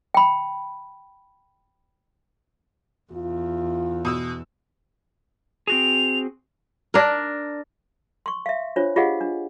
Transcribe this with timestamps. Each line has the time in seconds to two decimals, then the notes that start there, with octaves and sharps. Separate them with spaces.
0.14 G5 B5
3.12 E2 F4
4.05 B2 D#6 E6
5.67 C4 F#4 G#4 F7
6.94 D4 A#4
8.26 C6 C#6
8.46 E5 F5
8.76 D4 F4 C5 C#5
8.96 F4 G4 G#4 D#5 F5 F#5
9.21 D4